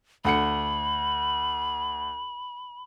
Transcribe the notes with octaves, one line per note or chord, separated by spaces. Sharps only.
D2 F#5 B5 C#7